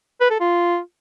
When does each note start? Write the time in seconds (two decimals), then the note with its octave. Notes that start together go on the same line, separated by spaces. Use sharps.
0.21 B4
0.30 A4
0.40 F4